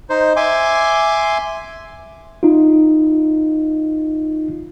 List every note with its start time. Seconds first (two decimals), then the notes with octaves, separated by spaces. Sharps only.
0.10 D#4 C5
0.36 E5 G#5 C6 D6
2.43 D#4 F4